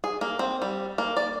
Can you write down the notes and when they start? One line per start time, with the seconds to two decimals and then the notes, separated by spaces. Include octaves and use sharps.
0.04 G#4
0.21 A#3
0.39 C4
0.62 G3
0.98 A#3
1.17 D5